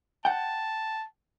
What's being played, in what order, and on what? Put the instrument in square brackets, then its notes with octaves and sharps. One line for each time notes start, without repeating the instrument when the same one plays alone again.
[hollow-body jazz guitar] F#5 G5 [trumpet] A5